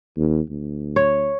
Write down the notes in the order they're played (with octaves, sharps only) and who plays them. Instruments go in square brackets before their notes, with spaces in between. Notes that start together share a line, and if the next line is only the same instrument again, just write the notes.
[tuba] D#2
D2
[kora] C#5